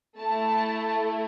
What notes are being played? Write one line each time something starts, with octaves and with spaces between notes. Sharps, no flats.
A3 E4 A4 A5